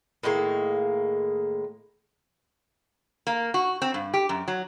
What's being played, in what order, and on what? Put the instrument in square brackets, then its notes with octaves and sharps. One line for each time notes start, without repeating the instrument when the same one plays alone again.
[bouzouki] A2 D#3 G#3 A#3
[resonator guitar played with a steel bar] A#3
F#4
C4
G2
G4
F#2
F#3